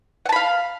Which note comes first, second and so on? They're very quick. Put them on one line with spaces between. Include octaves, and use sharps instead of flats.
F#5 A5 B5 F5